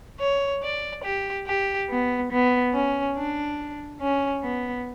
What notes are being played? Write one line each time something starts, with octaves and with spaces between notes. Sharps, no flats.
C#5
D5
G4
G4
B3
B3
C#4
D4
C#4
B3